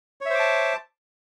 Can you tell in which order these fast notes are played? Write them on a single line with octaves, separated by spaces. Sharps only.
C#5 E5 C5 D6 A5